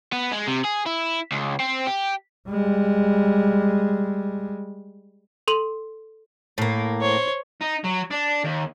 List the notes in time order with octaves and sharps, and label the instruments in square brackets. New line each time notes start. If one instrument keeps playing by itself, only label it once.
[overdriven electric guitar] B3
G#3
C3
G#4
E4
C#2
C4
G4
[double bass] G3 G#3
[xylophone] A4 C6 D#7 F#7
[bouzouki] A2 A#3
[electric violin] C5 C#5
[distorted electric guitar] D#4
F#3
D4
D#2